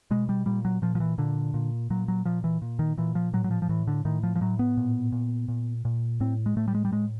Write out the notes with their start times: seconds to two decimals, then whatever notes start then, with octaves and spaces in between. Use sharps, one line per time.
0.11 B2 G#3
0.29 G3
0.46 A#2 G3
0.65 F#3
0.82 A#2 F3
0.95 F3
1.00 E3
1.18 A#2 D3
1.54 A#2
1.90 A#2 F#3
2.08 F#3
2.25 A#2 F3
2.44 E3
2.62 A#2
2.79 D#3
2.97 A#2 E3
3.15 F3
3.33 A2 F#3
3.44 F#3
3.51 F3
3.62 F3
3.69 A2 E3
3.88 D3
4.05 A2 D#3
4.23 F3
4.35 F3
4.41 A2 F#3
4.59 B3
4.77 A#2
5.12 A#2
5.48 A#2
5.85 A#2
6.20 A2 C4
6.46 G#3
6.56 A2 A3
6.68 G3
6.75 G#3
6.85 G3
6.92 A2 G#3